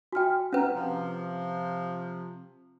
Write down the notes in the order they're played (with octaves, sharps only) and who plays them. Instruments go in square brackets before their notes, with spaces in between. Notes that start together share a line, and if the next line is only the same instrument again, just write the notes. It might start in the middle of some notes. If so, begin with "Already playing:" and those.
[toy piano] F#4 G5 [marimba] G#5 F6
[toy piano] C#4 B4 [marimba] F#5 G5 A#5
[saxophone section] C3 F3